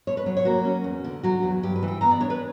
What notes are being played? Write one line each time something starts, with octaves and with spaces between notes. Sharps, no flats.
B2 C#5
B4
F#3 C#5
C#5
A#3 F#4
C#4
E2
D3
F#3 F#4
E2
G2 G4
B4
E3
G5
B3 A#5
D5
D4 C#5
B4